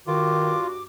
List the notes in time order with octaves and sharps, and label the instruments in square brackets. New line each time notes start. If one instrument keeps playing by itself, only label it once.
[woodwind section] G2 F#4 D6 [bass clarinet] D#3 [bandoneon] F4